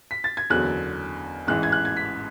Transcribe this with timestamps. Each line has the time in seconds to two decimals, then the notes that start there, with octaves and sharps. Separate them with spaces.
0.11 B6
0.24 A6
0.37 G#6
0.50 F#1 E2 D3 F#3 F#6
1.47 A1 G#2 E3 F#6
1.63 G#6
1.72 F#6
1.85 G#6
1.97 B6